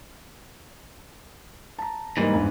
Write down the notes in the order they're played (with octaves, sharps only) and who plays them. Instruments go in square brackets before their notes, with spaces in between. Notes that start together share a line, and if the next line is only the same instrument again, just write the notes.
[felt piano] A5 A#5
[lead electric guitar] G#2 E3 [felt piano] G3 A#3 D#4
[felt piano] E2 G2